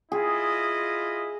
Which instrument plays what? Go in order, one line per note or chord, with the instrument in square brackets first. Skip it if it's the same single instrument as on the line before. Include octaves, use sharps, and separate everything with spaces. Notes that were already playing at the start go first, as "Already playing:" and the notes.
[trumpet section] E4 F4 D#5 [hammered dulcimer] G#4